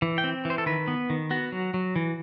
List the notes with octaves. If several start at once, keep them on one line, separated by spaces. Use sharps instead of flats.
E3
G5
C4
E3
C5
A4
D#3 B4
B3
D#3
B3 F#4
F#3
F#3
E3